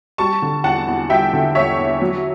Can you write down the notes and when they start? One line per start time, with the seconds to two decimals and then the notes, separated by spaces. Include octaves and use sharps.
0.18 G3 A5 C#6
0.42 D3
0.64 E2 F#5 A5
0.87 E2
1.09 G3 E5 G5
1.33 D3
1.55 E2 C#5 E5
1.78 E2
2.02 F#3